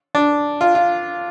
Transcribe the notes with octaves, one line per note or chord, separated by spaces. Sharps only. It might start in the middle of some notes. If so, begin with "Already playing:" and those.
D4
F4
F4